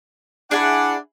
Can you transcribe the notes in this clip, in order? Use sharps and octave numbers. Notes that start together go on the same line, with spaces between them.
D4 E4 F4 G#4 F#5